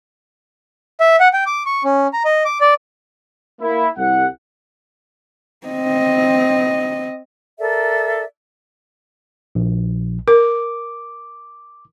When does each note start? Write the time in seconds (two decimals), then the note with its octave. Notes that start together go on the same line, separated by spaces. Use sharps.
1.00 E5
1.20 F#5
1.33 G5
1.46 D6
1.66 C#6
1.84 C#4
2.13 A#5
2.25 D#5
2.45 D6
2.61 D5
3.61 A#3 E4
3.98 C2 F#5
5.67 C4 D#5
7.59 A4 A#4 D5 E5
9.55 A#1
10.28 A#4 D6